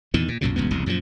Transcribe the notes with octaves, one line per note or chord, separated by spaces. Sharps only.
E2 A#2 D#3
A#2
B1 F#2 A#2 C#3
D#1 C#2 G2 B3
E1 C2 C#3
F#2 A#2 D3 F3